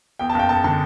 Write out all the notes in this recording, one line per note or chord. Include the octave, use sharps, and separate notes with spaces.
E2 G5
A5
F#1 G5
F#1 A5
D3 A5